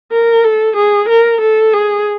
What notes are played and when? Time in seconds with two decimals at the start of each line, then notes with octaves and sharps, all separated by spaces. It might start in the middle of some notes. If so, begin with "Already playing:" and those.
0.12 A#4
0.45 A4
0.77 G#4
1.09 A#4
1.41 A4
1.74 G#4